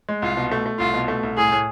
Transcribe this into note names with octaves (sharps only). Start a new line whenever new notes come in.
G#3
C2 F4
B2
A3
A3
C2 F4
B2
A3
C2
A2 G#4
A2